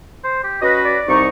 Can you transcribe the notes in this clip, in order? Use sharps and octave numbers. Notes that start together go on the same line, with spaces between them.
C5
G4
C#4 F#4 B4 D#5
D5
C2 D#4 C#6